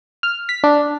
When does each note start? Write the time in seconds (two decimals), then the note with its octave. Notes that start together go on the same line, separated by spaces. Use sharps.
0.23 F6
0.49 B6
0.64 D4